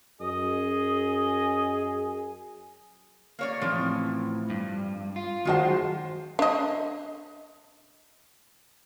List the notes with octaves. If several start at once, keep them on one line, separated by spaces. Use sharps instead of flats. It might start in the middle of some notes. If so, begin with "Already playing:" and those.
F#2 G#4 D#5
A#3 C#5 D5
A2 E3 F3 C4
G2
F4
D#3 F#3 G#3 C5 F#5
D4 D#5